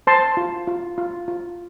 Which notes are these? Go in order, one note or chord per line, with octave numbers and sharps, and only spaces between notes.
C5 A5 C6
F4
F4
F4
F4